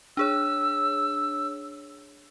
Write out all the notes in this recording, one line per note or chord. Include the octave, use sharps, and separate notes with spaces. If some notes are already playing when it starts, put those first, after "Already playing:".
D4 G#4 C#5 E6